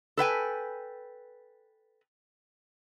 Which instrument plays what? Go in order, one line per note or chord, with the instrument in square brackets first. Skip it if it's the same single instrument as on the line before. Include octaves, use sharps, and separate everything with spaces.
[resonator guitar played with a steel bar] A4 B4 G5 G#5